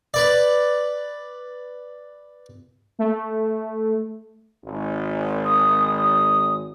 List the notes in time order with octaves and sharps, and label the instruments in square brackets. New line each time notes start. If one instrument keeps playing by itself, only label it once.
[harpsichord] B4 D5
[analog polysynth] A3
[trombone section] G#1
[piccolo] D#6
D#6